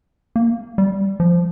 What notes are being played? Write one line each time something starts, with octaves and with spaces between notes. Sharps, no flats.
A#3
G3
F3